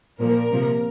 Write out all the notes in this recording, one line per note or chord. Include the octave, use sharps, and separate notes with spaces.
A#2 F3 A#3 A#4
C3 F3 A#3